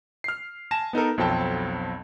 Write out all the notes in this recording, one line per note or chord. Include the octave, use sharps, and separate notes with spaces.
F6 C7
G#5 A5 A#6 E7
B3 D#4 A4 A#4
B1 F2 F#3 C4 G5 A5